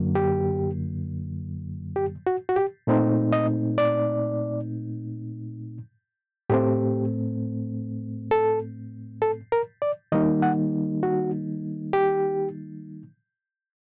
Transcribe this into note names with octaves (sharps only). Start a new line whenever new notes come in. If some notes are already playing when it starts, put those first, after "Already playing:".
Already playing: F#2 D3 F#3 A#3
G4
G4
F#4
F#4
G4
A#2 A3 C4 D#4
D#5
D5
A2 A3 C4 G4
A4
A4
A#4
D5
D#3 G3 A#3 D#4 D#5
F#5
F#4
G4